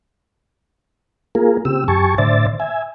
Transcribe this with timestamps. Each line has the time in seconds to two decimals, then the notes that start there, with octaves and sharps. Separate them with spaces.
1.35 A#3 F4 G#4 A#4
1.65 C#3 C4 G4 E6
1.88 F#2 G4 G#5 A5 C#6
2.18 A2 D3 C5 D5 E5 A6
2.60 E5 G#5